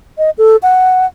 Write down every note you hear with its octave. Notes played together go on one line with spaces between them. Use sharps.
D#5
A4
F#5